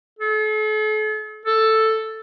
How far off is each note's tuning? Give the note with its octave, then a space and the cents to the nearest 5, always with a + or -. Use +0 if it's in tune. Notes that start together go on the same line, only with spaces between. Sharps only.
A4 -45
A4 +5